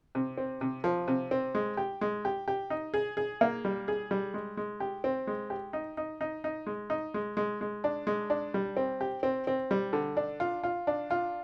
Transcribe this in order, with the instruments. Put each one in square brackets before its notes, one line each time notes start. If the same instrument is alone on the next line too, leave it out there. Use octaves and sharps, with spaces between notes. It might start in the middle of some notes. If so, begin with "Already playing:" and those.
[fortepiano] C3
C4
C3
F3
C3
C4
G#3
G4
G#3
G4
G4
D#4
G#4
G#4
A#3
G3
G#4
G3
G#3
G#3
G4
C4
G#3
G4
D#4
D#4
D#4
D#4
G#3
D#4
G#3
G#3
G#3
D4
G#3
D4
G3
C4
G4
C4
C4
G3
D3
D4
F4
F4
D4
F4